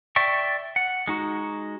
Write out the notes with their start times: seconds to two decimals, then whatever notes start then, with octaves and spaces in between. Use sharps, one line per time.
0.16 D5 E5 G5 C#6
0.76 F#5
1.07 G#3 D#4 F#4